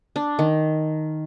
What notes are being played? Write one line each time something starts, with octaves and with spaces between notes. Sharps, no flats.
D4
D#3